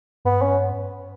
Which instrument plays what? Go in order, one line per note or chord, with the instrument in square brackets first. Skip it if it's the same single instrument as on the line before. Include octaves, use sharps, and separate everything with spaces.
[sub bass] G2 [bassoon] B3
[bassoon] C#4